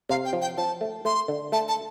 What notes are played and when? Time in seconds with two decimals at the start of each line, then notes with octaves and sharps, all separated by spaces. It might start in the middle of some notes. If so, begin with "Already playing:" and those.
0.09 C3 F5
0.25 G5
0.33 F3
0.42 G5
0.57 F3 A5
0.81 A3
1.05 A3 C6
1.28 D3
1.52 A3 A5
1.68 A5